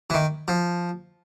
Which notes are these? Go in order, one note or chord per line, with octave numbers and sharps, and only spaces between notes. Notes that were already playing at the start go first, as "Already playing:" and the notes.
E3
D#3
F3